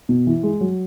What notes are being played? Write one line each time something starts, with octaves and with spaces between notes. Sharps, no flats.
B2
E3
G#3
F#3